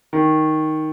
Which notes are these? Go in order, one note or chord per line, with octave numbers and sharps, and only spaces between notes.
D#3